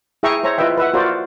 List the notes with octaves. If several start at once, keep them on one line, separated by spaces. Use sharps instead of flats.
E4 G#4 E5 G5 A#5 C#6
C5 C#5 E5 A#5
E4 F4 B4 D#5 E5 G5
B4 E5 F#5
F4 F#4 A#4 C5 D5